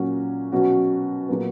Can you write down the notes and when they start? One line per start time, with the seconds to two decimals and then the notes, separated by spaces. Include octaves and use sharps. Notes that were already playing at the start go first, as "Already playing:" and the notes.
Already playing: A#2 F#3 C#4 F#4
0.52 B2 F#3 C#4 F#4
1.28 A#2 F#3 B3